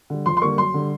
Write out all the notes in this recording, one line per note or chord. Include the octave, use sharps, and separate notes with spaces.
D3 G3
F2 C6
C6
D3 G3 A#3 C#6
F#2 C6
D3 G3